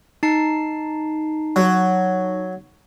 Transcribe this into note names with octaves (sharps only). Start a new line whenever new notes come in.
D#4 A5 C7
F#3